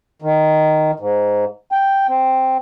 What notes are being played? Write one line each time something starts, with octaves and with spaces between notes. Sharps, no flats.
D#3
G#2
G5
C4